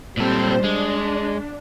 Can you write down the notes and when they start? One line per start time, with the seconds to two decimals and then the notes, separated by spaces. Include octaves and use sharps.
0.17 A#2 G3 C4 A4 C5
0.64 G#3 D4